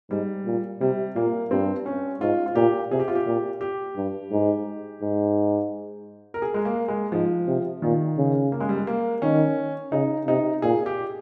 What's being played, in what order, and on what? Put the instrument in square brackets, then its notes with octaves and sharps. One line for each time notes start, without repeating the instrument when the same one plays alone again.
[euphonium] G#2 [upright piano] G3
[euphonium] A#2
[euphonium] C3 [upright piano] G3
[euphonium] A#2 [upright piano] A#3
[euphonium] G2 [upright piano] C4
[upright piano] C#4
[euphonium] G#2 [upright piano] F4
[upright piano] F4
[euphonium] A#2 [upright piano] G4
[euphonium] C3 [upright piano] G#4
[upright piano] G4
F4
G4
[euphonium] A#2
[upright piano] G4
[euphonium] G2
G#2
G#2
[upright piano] A#4
G#4
G#3
A#3
G#3
[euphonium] G#2 [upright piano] F3
[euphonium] C3
[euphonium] A#2 [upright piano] D#3
[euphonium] C#3
[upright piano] A#3
G#3
G3
G#3
A#3
[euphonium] D#3 [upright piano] C#4
[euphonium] C#3 [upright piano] D#4
[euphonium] C3 [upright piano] D#4
[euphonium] A#2 [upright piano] G#4
[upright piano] G4